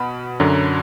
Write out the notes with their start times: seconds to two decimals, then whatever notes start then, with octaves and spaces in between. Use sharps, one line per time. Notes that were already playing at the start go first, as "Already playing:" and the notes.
Already playing: B2 F#5 B5
0.40 F#2 D3 F#3